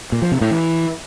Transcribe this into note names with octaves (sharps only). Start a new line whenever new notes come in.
A#2
F3
C3
A2
E3